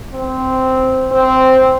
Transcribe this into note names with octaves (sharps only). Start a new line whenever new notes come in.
C4
C4